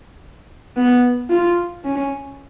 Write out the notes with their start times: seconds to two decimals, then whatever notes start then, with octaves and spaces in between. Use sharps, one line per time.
0.77 B3
1.30 F4
1.84 C#4